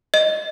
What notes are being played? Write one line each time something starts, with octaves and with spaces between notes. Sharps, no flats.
D#5